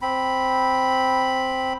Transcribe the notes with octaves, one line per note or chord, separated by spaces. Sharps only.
C4 B5